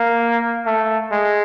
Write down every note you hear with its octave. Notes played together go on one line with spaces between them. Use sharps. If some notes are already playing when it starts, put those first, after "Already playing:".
Already playing: A#3
A3
G#3